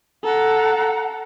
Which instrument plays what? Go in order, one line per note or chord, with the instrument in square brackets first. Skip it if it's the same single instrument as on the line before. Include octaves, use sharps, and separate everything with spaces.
[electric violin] A4 [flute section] F5 F#5 A#5